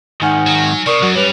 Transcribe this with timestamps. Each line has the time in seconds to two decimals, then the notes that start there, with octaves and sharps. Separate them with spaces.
0.22 G#2 D#3 D#4 F#5 G#5 F6
0.47 F#3
0.86 C3 A#4 D5 C#6 D#6
1.02 F#2 F#3
1.15 G3 B4 C#5 F7